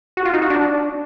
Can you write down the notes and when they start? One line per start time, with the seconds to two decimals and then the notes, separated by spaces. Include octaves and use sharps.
0.17 F#4
0.25 F4
0.34 D#4
0.42 F#4
0.50 D4